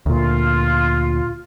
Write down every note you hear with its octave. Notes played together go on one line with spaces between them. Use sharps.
D2 A#2 F4